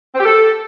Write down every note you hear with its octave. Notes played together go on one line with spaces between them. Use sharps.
C4
G4
A4